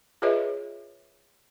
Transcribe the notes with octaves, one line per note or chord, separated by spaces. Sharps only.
F4 G#4 B4 C#5 D#5 E5